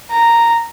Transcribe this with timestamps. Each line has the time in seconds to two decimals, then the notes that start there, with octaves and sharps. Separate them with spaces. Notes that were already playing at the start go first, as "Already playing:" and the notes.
0.11 A#5